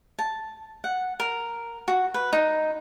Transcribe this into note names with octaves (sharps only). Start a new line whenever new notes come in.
A5
F#5
A#4
F#4
B4
D#4